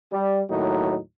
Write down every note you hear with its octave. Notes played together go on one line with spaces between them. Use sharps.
G3
D#2 A2 F#3 D#4